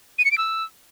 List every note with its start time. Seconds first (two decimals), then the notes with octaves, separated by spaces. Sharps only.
0.19 D#7
0.25 C#7
0.31 D7
0.38 E6